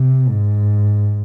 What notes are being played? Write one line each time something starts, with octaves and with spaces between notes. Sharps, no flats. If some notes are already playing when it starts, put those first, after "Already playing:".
Already playing: C3
G#2